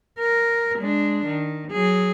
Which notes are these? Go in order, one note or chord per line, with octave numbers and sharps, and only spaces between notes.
A#4
G#3 D4
D#3
F#3 G#4